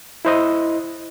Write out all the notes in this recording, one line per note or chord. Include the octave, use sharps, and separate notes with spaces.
E4 C5 D#5